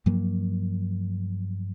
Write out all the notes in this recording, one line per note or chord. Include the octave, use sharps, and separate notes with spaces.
G2 F3 F#3 A#3